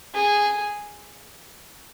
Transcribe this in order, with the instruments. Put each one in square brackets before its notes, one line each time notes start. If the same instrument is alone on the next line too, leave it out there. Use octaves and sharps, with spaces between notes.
[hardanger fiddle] G#4